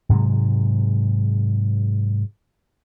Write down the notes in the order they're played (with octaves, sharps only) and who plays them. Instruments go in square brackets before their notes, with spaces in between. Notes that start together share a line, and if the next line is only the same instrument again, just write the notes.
[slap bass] G#2 C3 F#3 G#3